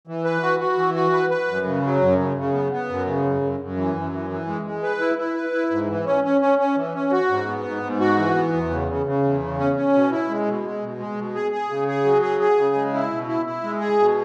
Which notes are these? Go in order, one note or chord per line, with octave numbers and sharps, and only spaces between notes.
E3
B4
F#4
F#4
E3
F#4
B4
B4
F#2
C#3
F#3
F#2
C#3
C#3
B3
B3
F#2
C#3
F#2
F#2
F#2
E3
F#2
E3
E3
G#3
G#3
B4
E4
E4
B4
E4
G#2
E3
C#4
C#4
C#4
C#4
E3
C#4
F#4
G#2
B3
G#2
G#2
F#4
E3
B3
E2
C#3
C#3
C#3
E2
C#3
C#4
C#4
B2
E4
G#3
B2
G#3
B2
G#3
B2
G#4
G#4
C#3
G#4
F#3
G#4
G#4
C#3
G#3
E4
B2
E4
E4
G#3
G#4
B2